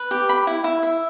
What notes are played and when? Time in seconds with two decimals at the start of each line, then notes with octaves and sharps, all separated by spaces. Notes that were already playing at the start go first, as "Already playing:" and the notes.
Already playing: B4
0.11 G4
0.29 B5
0.47 E4
0.64 E4
0.83 E5